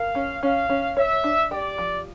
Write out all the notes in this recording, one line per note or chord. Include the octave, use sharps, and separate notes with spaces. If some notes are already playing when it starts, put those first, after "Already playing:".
Already playing: A#4 F5
C#4
C#4 F5
C#4
C#5 E5
D4
G4 D5
F3